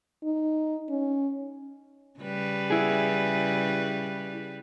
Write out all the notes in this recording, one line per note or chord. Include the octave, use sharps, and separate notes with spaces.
D#4
C#4
C#3 G3 B4
E4 G#4